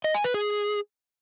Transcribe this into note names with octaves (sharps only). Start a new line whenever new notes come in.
D#5
G#5
B4
G#4